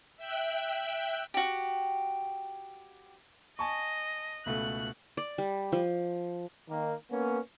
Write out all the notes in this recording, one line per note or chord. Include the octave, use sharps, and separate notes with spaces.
E5 G5 F#6
F#4 G4
D#5 G#5 A5 C#6
C#2 B2 A3 F#6
D5
G3
F3
D#3 A#3
A#3 B3 C#4